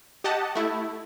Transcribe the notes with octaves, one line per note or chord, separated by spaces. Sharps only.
G4 D#5 F#5 A5
A3 E4